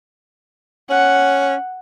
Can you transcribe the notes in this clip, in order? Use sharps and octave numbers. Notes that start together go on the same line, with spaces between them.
C#4 F#5